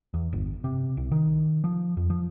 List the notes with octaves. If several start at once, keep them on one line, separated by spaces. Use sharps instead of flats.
E2
G1
C3
C2
D#3
F3
F2
F3